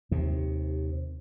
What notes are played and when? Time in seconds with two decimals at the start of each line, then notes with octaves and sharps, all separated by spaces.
0.11 D#2 C3